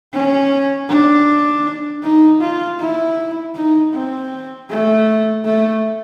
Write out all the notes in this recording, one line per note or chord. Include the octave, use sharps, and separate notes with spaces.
C#4
D4
D#4
F4
E4
D#4
C4
A3
A3